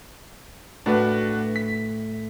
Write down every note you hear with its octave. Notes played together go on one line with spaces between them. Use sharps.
A2 D4 F#4 B4
B6